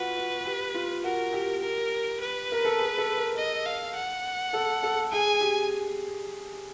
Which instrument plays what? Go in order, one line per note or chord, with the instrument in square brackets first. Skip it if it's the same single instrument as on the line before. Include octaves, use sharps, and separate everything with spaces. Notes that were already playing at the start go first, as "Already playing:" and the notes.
Already playing: [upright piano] F4 F#4 [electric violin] B4
[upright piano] F#4
G4
F4
[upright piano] F#4 [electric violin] A#4
[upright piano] G4
[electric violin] A#4
B4
[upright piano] A#4
A4
G#4
A4
A#4
[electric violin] D#5
F5
F#5
[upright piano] A4
A4
[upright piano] G#4 [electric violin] G#5
[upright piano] G4